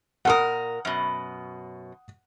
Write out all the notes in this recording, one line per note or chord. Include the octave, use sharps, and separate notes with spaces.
A#2 A4 A#4 F#5 D#6
F#2 B2